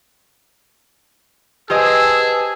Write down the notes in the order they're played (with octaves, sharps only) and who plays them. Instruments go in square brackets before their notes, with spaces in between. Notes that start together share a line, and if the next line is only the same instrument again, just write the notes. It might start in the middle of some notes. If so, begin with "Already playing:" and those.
[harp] G4 C5 D#5 [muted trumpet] G#4 [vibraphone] B4 G#5 A5 [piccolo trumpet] E6